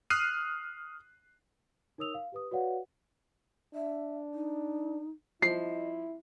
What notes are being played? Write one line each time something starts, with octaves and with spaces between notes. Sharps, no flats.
D#6 F6 F#6 C7 D#7
D#4 A#4 C#5 D#6 E6 F7
F5
G4 B4 D#6
F#4 B4 C#5 D5 F5 F#5
D4 E5
D#4
F3 E4 D#5 C7